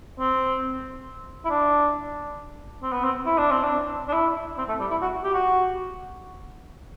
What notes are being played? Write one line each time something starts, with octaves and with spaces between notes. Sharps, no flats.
C4
E4
D4
C4
B3
C4
E4
D4
C4
D4
D4
E4
C4
A3
G3
E4
F#4
G4
F#4